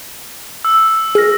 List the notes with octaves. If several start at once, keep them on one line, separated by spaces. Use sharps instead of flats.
E6
G#4 F6 A#6